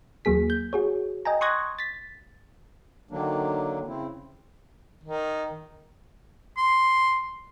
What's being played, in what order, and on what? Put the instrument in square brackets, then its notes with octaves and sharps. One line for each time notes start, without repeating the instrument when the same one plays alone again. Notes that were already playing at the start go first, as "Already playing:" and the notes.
[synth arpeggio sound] D#2 F#3 A#3 G#4 B6
G6
F#4 G#4 C#5
D#5 G5 G#5 A#5
C6 C#6 D#6 F#6 G#6 A#6
A6 B6
[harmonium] D3 D#3 F#3 A#3 D4
C#3 C4 E4
[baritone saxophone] D#3
[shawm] C6